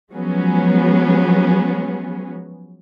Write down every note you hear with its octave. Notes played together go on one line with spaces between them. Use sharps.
F3 F#3 G#3 B3 C#4